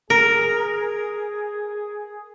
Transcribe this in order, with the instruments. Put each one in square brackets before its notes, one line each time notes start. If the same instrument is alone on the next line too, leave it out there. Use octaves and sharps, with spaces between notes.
[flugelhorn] G#4 [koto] A#4